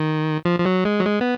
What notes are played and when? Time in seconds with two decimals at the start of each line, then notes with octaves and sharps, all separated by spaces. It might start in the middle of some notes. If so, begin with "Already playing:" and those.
Already playing: D#3
0.45 F3
0.60 F3
0.66 F#3
0.85 G#3
1.00 F#3
1.05 G#3
1.21 B3